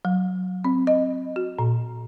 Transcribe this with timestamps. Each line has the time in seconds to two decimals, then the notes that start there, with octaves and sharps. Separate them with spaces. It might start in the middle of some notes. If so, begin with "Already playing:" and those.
0.05 F#3
0.64 C4
0.87 D#5
1.36 F#4
1.59 A#2